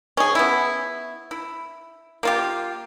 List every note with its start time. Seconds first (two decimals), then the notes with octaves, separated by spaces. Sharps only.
0.17 C#4 G#4
0.35 B3 E4
1.31 E4
2.23 A#3 F4 G4